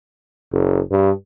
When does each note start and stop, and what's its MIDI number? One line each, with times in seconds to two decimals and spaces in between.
0.52 0.80 30
0.91 1.11 43